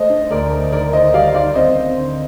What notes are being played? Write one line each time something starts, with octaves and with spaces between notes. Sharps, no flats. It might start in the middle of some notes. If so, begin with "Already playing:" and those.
Already playing: A3 C5 D#5
D4
D2 A#4 D5
A3
D#3 A#4 D5
D#3 C5 D#5
G3 D5 F5
D#3 D5 F5
C4 C5 D#5
C4
D3